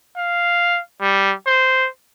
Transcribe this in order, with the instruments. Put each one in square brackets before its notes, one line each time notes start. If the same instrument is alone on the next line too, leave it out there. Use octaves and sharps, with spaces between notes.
[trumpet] F5
G3
C5